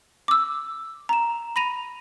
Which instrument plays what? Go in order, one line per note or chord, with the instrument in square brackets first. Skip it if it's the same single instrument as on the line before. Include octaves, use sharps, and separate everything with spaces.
[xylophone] D6 E6
A#5 E7
B5 A#6 D#7 F7